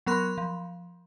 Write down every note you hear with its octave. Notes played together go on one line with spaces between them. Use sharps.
F#3 B3 A#4 B5 C6 F#6
F3